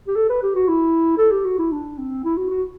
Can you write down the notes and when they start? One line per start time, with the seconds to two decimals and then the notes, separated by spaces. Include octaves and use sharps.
0.07 G4
0.16 A4
0.30 B4
0.42 G4
0.55 F#4
0.68 E4
1.17 A4
1.31 G4
1.44 F#4
1.58 E4
1.72 D4
1.98 C4
2.24 E4
2.37 F#4
2.50 F#4